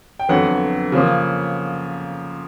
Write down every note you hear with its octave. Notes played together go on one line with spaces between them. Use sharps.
G5
F2 D3 F#3 B3 F#5
C#3 F3 A#3